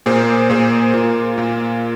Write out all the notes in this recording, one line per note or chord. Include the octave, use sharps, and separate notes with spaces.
A#2 A#3 G#4 C5
A#2 A#3 G#4 C5
A#2 A#3 F4
A#2 A#3 F4